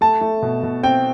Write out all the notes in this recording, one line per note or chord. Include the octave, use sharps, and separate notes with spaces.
A3 A5
A3
B2
B2
C4 G5